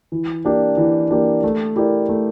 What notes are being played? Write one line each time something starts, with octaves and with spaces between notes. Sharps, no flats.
E3
A#3 D4 G4
E3
A#3 D4 G4
A3
E4 G4 A#4 D5
A3